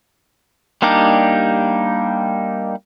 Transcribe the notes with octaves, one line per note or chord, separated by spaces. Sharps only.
G3 A#3 D4 D#4 G4